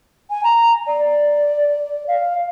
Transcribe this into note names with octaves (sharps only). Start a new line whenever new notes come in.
G#5
A#5
D5
F5